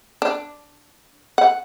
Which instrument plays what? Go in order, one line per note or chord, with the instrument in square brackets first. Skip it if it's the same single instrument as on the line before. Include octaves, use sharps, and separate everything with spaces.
[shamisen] D4
F#5